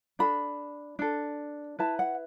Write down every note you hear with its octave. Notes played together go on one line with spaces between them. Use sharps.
D4 A4 B5
D4 A4
E4 B4 A5
F#5